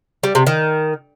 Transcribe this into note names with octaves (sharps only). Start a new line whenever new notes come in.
G3
C3
D#3